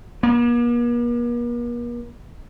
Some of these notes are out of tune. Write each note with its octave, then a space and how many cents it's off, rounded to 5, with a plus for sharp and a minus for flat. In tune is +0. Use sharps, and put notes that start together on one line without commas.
A#3 +45